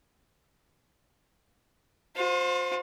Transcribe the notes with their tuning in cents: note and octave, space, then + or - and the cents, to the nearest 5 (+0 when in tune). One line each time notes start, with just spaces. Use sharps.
F4 +45 C5 +0